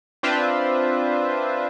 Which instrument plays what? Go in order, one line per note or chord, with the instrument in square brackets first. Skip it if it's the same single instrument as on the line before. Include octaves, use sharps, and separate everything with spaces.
[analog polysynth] C4 D4 F4 B4 C5 E5